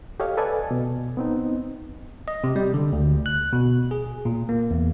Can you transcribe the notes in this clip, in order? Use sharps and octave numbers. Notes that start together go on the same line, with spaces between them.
G4 A4 C#5 D#5 F5
A4 B4 D5 D#5 G#5 A5
B2
B3 C4 D#4
D#5
C3
G3
D3
D2
F#6
B2
G#4
A#2
A#3
E2